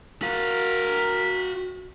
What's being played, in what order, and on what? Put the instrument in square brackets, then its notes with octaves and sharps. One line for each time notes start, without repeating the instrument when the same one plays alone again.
[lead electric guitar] F#4 F5 [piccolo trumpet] A#4 [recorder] B6